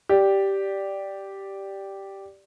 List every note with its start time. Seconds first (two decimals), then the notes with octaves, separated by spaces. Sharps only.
0.09 G4 D5